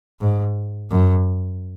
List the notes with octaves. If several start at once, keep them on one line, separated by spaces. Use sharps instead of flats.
G#2
F#2